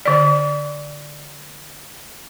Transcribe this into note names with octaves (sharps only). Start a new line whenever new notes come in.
D3 D5